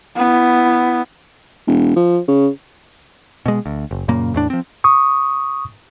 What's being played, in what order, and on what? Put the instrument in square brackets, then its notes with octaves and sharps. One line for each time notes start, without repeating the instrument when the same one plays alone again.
[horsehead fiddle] B3 E4
[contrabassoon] E1
F3
C#3
[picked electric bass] B2 G#3
D2
F#1
F#2 A#2 C#3 A#3
E2 A2 D4
F3 C4
[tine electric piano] C#6 D#6